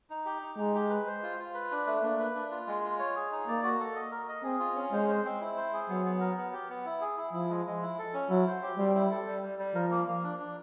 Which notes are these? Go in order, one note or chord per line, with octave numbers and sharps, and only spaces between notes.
D#4
G4
D#4
G#3 D#4
G4
B4
C5
F4
F4
B4
D4
A3
A#3 D4
B4
D4
F4
G#3
F4
C#5
G#4
D#4
A#3 D5
F#4
A4
D#5
A#4
D#5
C4 G#4
F4
C#4
G#3 C5
C5
C4
E4
C5
G#4
F#3 B3
B3
A#4
B3
G4
B3
E4
G#4
E4
F3 E4
G#3
G#3
E4
A4
C#4
F#3 E4
C5
G4
G3 C4
E4
A4
G3
G3
G3
F3 A#4
A#3
A#3
D4
D4